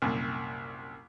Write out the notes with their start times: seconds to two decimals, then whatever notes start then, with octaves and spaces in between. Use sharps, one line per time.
0.02 C2 F#2 A#2